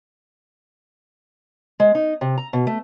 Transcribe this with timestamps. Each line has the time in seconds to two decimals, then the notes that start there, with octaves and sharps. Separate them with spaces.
1.80 G#3
1.95 D#4
2.21 C3
2.38 A#5
2.53 B2
2.67 A3